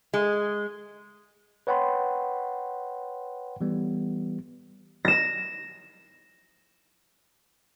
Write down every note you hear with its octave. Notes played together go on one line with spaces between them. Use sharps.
G#3
B4 C#5 F#5 G5 B5 C6
E3 G3 B3
A#6 E7